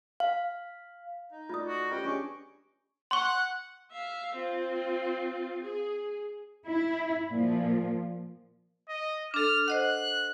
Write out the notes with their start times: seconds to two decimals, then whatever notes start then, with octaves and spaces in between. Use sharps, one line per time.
0.20 F5
1.32 D#4
1.49 A3 F4 D5 D#5 D#6
1.67 F#4
1.91 C#4 F4 G4 B4 D#5 G5
2.05 C#4 D4 G4 G#4 C#6 D6
3.11 F#5 C6 C#6
3.92 E5 F5
4.35 C4 F4
5.63 G#4
6.67 E4
7.29 A#2 F3
8.89 D#5
9.34 D4 A4 F6
9.68 C5 D#5 F#5 F#6